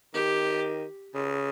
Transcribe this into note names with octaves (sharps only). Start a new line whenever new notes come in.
D#3 G4
C#3